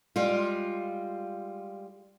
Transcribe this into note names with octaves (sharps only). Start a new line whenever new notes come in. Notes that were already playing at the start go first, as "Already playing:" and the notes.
G3 G#3 F4